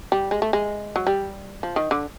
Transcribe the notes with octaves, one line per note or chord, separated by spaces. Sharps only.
G3
G#3
A3
G#3
F#3
G3
F3
D#3
D3